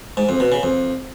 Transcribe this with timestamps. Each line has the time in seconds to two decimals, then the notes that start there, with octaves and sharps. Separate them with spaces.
0.17 G#2
0.29 F2
0.40 B2
0.52 C#3
0.63 F2